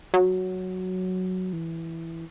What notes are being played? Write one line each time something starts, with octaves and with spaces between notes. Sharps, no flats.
F#3
E3